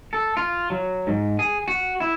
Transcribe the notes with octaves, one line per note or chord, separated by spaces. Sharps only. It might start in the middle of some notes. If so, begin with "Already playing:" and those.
A4
F4
F#3
G#2
G#4
F#4
E4